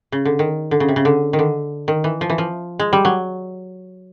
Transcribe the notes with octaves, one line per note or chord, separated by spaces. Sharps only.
C#3
D3
D#3
D3
C#3
C3
C#3
D3
D#3
D3
D#3
E3
F3
E3
F3
G#3
G3
F#3